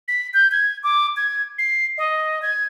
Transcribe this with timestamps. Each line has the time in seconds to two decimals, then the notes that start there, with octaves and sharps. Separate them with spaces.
0.08 B6
0.34 G6
0.52 G#6
0.83 D6
1.17 G#6
1.58 C7
1.98 D#5
2.42 G#6